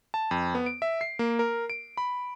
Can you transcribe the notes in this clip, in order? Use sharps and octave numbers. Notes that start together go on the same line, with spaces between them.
A5
F2
B3
D7
E5
C7
A#3
A#4
D7
B5